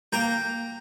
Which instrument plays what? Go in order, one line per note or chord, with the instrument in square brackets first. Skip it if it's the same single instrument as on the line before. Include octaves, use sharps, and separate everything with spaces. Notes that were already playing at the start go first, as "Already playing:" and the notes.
[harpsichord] A#3 G5 A#5